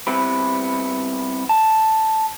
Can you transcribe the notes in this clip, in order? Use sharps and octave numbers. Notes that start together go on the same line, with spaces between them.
G3 B3 C4 E4 B4
A5